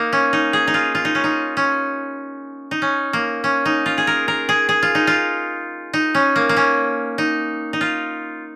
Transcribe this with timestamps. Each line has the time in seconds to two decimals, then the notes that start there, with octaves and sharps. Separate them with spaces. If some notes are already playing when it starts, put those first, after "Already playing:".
Already playing: A#3 D#4
0.13 C#4
0.33 D#4
0.53 G#4
0.67 D#4
0.74 F4
0.95 F4
1.05 D#4
1.15 C#4
1.24 D#4
1.57 C#4
2.71 D#4
2.82 C#4
3.13 A#3
3.44 C#4
3.65 D#4
3.86 F4
3.98 G#4
4.07 A#4
4.28 A#4
4.49 G#4
4.69 G#4
4.83 F4
4.95 D#4
5.07 F4
5.93 D#4
6.15 C#4
6.36 A#3
6.49 A#3
6.57 C#4
7.18 D#4
7.73 D#4
7.81 F4